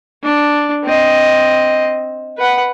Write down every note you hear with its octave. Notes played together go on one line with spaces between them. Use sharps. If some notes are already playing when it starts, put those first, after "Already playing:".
D4
C4 D#5
B4 F#5